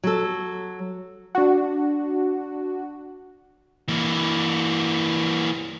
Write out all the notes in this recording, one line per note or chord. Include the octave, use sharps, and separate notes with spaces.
F#3 A4
D4 F#4
E3 A#3